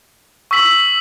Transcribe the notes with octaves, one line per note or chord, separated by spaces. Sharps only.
C#6 E6 B6 F#7